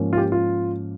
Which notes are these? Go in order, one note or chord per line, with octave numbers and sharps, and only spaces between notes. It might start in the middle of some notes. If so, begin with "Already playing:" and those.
Already playing: G#2 F3 A#3 C#4
F4
G4
F4